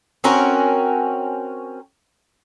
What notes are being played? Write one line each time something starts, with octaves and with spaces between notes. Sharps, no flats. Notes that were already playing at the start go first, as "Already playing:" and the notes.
C4 C#4 F#4 A#4